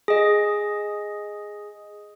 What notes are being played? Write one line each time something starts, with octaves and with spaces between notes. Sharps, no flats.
G#4 D#5